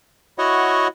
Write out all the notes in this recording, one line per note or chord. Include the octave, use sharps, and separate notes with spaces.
E4 F#4 C#5 D#5 F#5